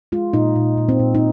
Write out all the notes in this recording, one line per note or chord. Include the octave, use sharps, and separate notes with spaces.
G#3 F4
A#2 D#4
A#2
A#2
C4
A#2
D#4